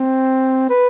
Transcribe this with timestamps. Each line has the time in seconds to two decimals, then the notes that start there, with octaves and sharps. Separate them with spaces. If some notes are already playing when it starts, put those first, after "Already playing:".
Already playing: C4
0.70 B4